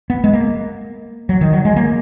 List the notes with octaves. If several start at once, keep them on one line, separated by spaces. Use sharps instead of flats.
B3
G#3
A#3
F#3
D#3
F#3
G#3
A#3